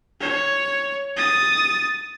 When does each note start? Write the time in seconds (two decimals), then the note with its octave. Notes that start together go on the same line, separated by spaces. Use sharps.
0.21 C#5
1.17 D#6 A6